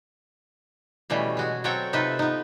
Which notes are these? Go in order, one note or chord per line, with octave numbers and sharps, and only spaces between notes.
B2 E3 G3 A3 C#4
G#3 F#4 G#4
F#3 C4 A4 C#5 F#5 G5
C3 D#4 F4 A4 B4 E5
B3 D#4